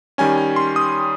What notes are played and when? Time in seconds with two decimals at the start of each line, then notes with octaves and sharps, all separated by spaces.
0.18 D#3 G3 C#4 G#5
0.38 G#5
0.56 C6
0.76 D#6